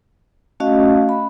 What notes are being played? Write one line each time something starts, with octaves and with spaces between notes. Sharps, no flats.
A3 C#4 F#4 D#5 F5
B5